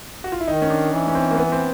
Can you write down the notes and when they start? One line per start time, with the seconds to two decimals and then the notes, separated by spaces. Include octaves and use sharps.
0.24 F#4
0.32 F4
0.40 E4
0.47 D#3 D#4
0.62 C#4
0.70 D4
0.93 E3
1.07 C#4
1.15 C4
1.31 A#3
1.37 B3
1.52 C4